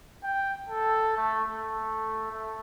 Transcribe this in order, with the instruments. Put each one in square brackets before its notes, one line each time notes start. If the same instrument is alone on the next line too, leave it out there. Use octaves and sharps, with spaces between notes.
[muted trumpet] G5
A4
A3
A3
A3